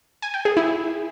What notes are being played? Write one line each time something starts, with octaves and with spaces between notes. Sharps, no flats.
G#5
G5
G#4
E4